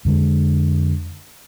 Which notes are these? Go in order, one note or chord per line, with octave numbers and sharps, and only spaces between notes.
F2 D3 G#3